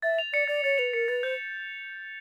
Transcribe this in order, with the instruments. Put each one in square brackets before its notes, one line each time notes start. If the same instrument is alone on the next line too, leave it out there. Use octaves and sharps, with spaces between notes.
[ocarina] E5 [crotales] A6
[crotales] F7
[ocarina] D5 [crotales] C#7
[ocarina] D5 [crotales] A6
[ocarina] C#5 [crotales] A6
[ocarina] B4 [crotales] F7
[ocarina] A#4 [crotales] C#7
[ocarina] B4 [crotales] A6
[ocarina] C5 [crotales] G6